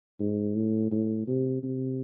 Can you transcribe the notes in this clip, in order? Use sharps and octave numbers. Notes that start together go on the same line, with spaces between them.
G#2
A2
A2
C3
C3